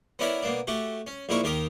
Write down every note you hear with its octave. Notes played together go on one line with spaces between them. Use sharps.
B3 C#4 D4 E4 A#4 B5
B2 A#3 D4
A3 F#4 G4
C#4
A#1 A#2 D#4 E4 A#4 C#6
D#2 D#3 G4 A#4 D#6